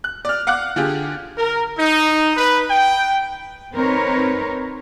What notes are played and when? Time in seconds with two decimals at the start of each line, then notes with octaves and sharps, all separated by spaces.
0.04 F#6
0.25 D5 F6
0.47 F5 F#5 D6 F6 F#6
0.76 D3 D4 F4 G4 G#4
1.38 A#4
1.78 D#4
2.37 B4
2.70 G5
3.73 C4 D#4 A#4 B4 C#5